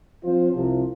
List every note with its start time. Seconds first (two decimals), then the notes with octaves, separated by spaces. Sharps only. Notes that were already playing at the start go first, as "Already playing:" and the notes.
0.24 F3 C4 F4 C5
0.53 C2 C3 F3